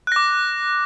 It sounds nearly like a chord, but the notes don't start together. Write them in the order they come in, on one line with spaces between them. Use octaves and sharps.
F#6 A#6 D6